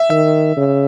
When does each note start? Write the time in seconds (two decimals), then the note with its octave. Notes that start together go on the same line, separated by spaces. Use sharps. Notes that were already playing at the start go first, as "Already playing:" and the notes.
Already playing: E5
0.10 D#3 E5
0.57 C#3